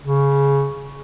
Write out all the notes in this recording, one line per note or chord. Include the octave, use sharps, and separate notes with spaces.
C#3